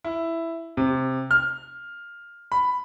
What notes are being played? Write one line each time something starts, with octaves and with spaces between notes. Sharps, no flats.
E4
C3
F6
B5